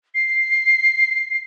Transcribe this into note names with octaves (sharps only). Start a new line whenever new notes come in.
C7